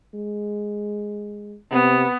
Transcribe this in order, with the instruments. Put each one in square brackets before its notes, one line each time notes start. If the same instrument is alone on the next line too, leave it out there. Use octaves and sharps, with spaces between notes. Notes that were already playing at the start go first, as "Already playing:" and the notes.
[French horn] G#3
[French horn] C3 [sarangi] B3